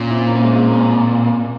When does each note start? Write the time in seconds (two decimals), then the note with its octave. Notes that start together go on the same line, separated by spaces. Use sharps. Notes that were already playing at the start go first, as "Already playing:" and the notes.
Already playing: A#2 C#4 F4
0.10 C4 E4
0.27 A#3 C#4
0.44 G#3 C4
0.68 A#3 C#4